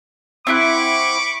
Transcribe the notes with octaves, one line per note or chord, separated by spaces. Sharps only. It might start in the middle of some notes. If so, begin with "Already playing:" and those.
C4 E4 F#5 B5 C#6 D6